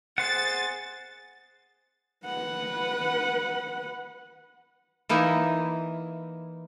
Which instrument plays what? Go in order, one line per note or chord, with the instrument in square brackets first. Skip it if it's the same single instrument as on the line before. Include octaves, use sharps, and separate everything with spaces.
[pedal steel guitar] G#4 C5 F#5 [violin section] A6
[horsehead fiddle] B4 F#5
[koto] E3 A#3 D#4 E4